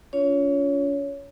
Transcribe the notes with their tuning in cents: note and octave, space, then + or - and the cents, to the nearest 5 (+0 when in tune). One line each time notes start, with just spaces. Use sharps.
C#4 +35 F4 +0 C#5 +15